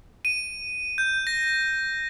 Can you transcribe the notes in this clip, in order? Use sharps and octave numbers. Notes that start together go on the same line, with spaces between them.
D#7
G6
A#6